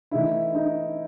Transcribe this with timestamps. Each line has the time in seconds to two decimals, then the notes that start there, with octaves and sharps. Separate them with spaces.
0.11 E3 A3 D#4 E4
0.55 D#4